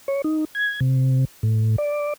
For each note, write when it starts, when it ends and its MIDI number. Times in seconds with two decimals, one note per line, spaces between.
0.08 0.22 73
0.24 0.45 63
0.55 0.80 92
0.81 1.25 48
1.43 1.76 45
1.78 2.14 74